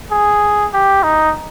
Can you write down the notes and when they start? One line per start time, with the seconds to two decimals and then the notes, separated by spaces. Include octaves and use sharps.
0.11 G#4
0.73 G4
1.03 D#4